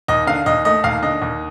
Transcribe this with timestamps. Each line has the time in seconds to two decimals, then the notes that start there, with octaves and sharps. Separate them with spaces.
0.08 D#2 D#5
0.27 D3 F5
0.46 D#2 D#5
0.65 A3 D#5
0.84 D#2 F5
1.03 D3 D#5
1.22 D#2